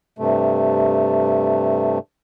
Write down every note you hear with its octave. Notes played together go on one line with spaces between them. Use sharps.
G2 C3 A3